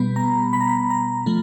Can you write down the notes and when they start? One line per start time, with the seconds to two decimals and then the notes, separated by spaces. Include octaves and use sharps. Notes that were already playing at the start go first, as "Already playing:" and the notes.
Already playing: B2 G3 B3 B5
0.16 A#5
0.53 B5
0.61 A#5
0.69 B5
0.90 A#5
1.26 F3 A3